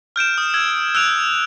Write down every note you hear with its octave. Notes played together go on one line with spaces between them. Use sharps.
F6 G6 D7 E7
D#6
E6 G#6
E6 F#6 D7 F7